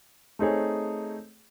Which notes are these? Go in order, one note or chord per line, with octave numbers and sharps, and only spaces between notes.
A3 C4 D#4 G#4 C#5